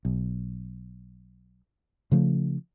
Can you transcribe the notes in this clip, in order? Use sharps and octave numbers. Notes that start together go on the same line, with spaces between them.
B1
C#3 F3 A3